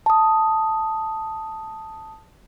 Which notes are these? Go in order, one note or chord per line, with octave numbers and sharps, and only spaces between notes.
A5 D#6